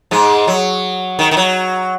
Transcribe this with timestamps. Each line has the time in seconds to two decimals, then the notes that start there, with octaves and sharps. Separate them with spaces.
0.11 G#2 G#3
0.48 F#3
1.19 D#3
1.31 D#3
1.37 F#3